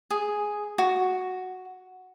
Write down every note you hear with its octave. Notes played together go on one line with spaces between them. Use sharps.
G#4
F#4